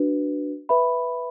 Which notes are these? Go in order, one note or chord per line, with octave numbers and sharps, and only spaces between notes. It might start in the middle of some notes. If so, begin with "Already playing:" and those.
Already playing: D4 F#4 B4
B4 E5 B5